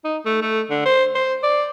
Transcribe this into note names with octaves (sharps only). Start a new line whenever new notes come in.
D#4
A3
A3
D3
C5
C5
D5